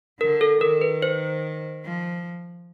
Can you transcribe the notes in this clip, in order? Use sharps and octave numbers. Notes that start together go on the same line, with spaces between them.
D3 A#4
A4
D#3 A#4
B4
C5
F3